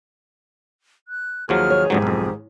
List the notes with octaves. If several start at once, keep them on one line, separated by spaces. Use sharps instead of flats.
F#6
D#2 D#3 F3 F#3 G#4 F6
C#5
F2 G#2 D3 F#3 G4
B1 F2